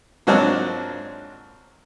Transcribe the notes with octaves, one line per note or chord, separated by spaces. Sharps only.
G#2 F3 F#3 A#3 C4 D4